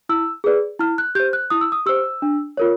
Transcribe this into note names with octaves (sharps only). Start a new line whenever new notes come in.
E4 E6
G#4 B4 D5
E4 F6
F#6
G4 C5 G6
F#6
E4 D#6
E6
D#6
G4 C5 E6
D4
F4 A#4 C#5